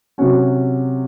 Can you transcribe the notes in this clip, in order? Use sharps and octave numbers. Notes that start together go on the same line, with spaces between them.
C3 F#3 C#4 F#4